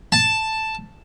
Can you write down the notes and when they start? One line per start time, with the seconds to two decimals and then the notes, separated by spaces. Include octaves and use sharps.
0.12 A5